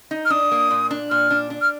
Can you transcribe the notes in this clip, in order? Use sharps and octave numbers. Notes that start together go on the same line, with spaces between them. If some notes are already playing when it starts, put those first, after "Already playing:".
D#4
F6
D4 D#6
A#3
A#2
D4
A#2 F6
D4
D4
F6